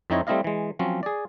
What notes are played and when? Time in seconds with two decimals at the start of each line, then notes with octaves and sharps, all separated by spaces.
0.10 F2 C4 D#4 E4 C#5 D#5
0.27 G3 A3 C4 E4 D#5 F5
0.44 E3 G#3
0.79 F3 F#3 C4 C#4
1.03 G#4 D5